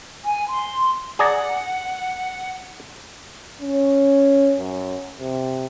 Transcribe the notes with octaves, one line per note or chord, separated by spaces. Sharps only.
G#5
C6
G#4 D5 F#5 A#5
C#4
F#2
C3